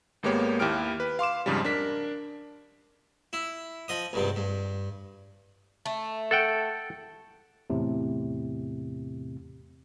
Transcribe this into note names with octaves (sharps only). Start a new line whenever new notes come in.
G#1 G#3 A#3 B3 G4 C#5
D#2 E4 G4 G5 F6 D7
B4
F5 C6 D6 E7
F2 G#2 C#3 F3 G3
D4 A#4 B6
E4
F3 D#5 D#6
C#2 G2 C3
G2
A3
A4 F#5 G5
E2 A2 C3